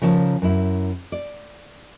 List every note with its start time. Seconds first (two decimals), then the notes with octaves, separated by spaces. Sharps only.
0.02 C#3 F3 A#4 C#5 A5
0.42 F#2 E4
1.12 D5